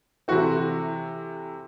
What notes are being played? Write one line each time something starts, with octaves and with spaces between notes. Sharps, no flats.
C3 E3 A3 C4 F#4